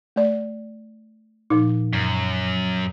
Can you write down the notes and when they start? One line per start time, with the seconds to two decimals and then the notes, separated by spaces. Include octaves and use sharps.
0.16 A3 D5
1.50 A#2 F3 D#4
1.93 F#2